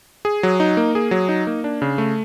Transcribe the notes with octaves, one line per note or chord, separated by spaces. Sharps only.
G#4
F#3
D#4
A#3
G#4
F#3
D#4
A#3
D4
C#3
A3